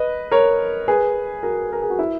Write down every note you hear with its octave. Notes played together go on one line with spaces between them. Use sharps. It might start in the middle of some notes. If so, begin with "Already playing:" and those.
Already playing: B4 D#5
A#4 C#5
G#4 B4
F#4 A#4
A#4
G#4
F#4
E4